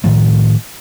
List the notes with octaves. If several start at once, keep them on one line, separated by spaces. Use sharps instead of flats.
A2 D#3 F3 A3